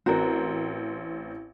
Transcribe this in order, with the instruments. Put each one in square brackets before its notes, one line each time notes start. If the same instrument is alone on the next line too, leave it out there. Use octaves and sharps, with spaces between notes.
[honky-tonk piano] A1 C4 [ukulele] F#4 A#4